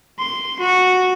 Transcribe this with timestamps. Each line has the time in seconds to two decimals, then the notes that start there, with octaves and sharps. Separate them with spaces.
0.19 C6
0.60 F#4